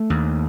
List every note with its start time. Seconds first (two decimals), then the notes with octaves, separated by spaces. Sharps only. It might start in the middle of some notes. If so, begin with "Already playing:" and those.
Already playing: A3
0.10 D#2